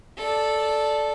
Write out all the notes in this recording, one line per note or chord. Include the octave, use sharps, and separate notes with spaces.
A4 D5